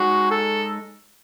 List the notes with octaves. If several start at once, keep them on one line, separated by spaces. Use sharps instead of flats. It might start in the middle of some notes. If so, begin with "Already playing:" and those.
Already playing: G#3 D#4 F#4 G#4 C#5
A4